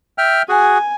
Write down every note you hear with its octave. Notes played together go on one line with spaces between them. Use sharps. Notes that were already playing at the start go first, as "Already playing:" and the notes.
E5 G5 F6
F#4 G#4 G#5